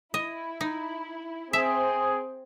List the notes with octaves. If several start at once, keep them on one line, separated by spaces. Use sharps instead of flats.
E4 D#5
D#4
C4 G#4 E5